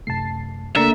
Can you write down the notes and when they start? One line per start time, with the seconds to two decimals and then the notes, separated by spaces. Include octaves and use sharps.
0.07 F#2 C3 A3 A5 C7
0.76 C#3 A3 A#3 D4 A4 A#4 E5